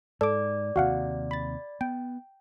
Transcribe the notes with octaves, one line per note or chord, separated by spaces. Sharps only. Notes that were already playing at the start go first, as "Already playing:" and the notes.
G#2 A4 D5 D6
D#2 C3 F#4 F5 F#5
B5 A6
B3 G5